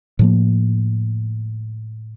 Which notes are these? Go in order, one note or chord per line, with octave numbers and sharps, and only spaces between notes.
A2 F3 A#3